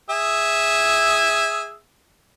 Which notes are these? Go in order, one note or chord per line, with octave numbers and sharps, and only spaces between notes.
G#4 E5